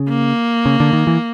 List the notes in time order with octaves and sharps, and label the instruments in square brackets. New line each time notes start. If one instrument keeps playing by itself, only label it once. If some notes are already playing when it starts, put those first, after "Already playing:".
Already playing: [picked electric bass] C#3
[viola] A#3
[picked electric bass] C#3
D3
D#3
E3